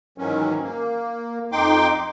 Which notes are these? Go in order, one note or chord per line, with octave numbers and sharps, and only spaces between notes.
G#2 D#3 E3 F#3 C#4
A#3
F2 D#4 G5 C6 D6